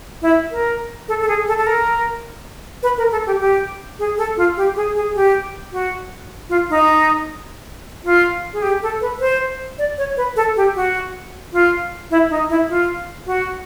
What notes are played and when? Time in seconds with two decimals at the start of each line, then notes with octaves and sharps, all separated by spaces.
0.22 E4
0.51 A#4
1.08 A4
1.21 A4
1.28 G#4
1.47 A4
1.58 A4
1.66 A#4
2.83 B4
2.97 A#4
3.12 A4
3.26 G4
3.40 G4
3.99 G#4
4.17 A4
4.37 F4
4.57 G4
4.76 G#4
4.95 G#4
5.15 G4
5.72 F#4
6.49 F4
6.70 D#4
8.04 F4
8.53 G#4
8.62 G4
8.82 A4
9.01 B4
9.20 C5
9.78 D5
9.98 C#5
10.17 B4
10.36 A4
10.56 G4
10.75 F#4
11.53 F4
12.10 E4
12.30 D#4
12.49 E4
12.68 F4
13.26 F#4